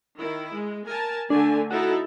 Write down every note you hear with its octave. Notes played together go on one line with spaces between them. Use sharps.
D#3 E4
G#3
A#4 G#5 A5
D3 A3 D4 G#5
D#4 E4 F#4 A4